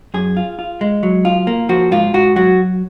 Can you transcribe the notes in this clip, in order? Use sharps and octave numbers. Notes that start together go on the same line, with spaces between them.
F#2 G#4
F4
F4
G#3
F#3
F4
A#3
F3 F#4
G#2 F4
G#2 F#4
F#3 F#4